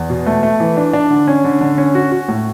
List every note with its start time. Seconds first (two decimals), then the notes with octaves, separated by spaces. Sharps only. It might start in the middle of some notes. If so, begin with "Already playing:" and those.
Already playing: E2
0.10 B2
0.27 A3
0.43 A3
0.60 E3
0.77 D4
0.93 D4
1.10 D3
1.28 C#4
1.44 D3
1.61 D3
1.78 C#4
1.95 F#4
2.12 F#4
2.28 A2